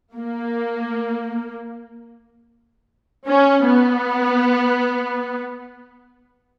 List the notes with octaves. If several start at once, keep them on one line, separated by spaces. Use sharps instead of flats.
A#3
C#4
B3